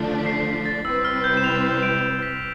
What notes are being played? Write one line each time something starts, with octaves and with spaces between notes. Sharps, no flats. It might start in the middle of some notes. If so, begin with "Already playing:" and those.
Already playing: D3 F3 A3 D4
B6
C7
C7
B6
A6
C3 G3 C4 E4 B4 E6
F6
G6
E7
F7
D7
B6